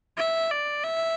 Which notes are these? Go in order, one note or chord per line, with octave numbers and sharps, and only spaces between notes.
E5
D5
E5